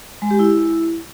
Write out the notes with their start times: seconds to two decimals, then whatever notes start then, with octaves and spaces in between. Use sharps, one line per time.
0.22 G#3
0.31 G4
0.39 E4